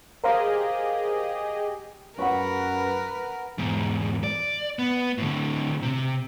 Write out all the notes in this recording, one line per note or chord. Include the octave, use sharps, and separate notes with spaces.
G4 G#4 A#4 C5 D#5 F5
F#2 A#4 B4 F#5 B5 C#6
E2 G#2
D5
B3
A2 D3
C3